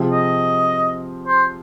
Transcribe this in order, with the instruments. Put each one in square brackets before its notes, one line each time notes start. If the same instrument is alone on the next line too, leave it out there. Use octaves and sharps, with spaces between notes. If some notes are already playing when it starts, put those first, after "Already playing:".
Already playing: [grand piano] C3 F3 C4 G#4
[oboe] D#5
C5